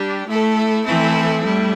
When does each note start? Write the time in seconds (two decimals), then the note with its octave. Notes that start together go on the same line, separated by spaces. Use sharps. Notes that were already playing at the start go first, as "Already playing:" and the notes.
Already playing: G3 D4 G4
0.26 A2 A3 E4 A4
0.85 A2 E3 C4 E4 A4
1.43 A2 G3 E4